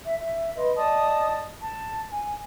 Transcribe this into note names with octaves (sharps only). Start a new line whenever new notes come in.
E5
E5
B4 D#5 C6
D5 D#5 A5 D#6
A5
G#5